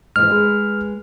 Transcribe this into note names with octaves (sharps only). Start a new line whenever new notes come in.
G#2 E3 F6
G#3 B4